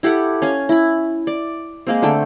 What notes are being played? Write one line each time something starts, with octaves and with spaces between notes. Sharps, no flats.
E4 G4 A4 F#5
C#4 F5 G#5
E4 B5
D5
G#3 A#3 C4
D3 A3 A4 G5